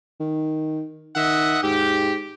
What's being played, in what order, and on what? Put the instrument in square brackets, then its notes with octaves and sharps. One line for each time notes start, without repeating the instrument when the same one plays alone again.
[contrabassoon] D#3
[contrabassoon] D#3 [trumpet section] D#5 E5 F#5
[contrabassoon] G#2 [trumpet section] G4